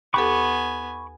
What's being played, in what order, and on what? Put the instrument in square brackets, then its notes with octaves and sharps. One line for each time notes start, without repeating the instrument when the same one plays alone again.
[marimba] D#2 G4 A4 [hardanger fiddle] B3 G#5 [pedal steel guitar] B5 C#6 D6